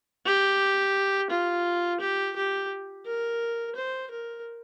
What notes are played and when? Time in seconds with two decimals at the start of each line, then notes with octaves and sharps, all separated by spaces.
0.26 G4
1.30 F4
2.00 G4
2.36 G4
3.06 A#4
3.76 C5
4.11 A#4